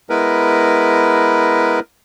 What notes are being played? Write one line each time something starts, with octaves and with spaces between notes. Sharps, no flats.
G#3 B3 E4 A#4 B4